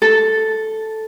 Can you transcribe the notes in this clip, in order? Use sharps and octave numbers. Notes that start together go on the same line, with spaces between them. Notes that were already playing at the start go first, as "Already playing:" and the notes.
A4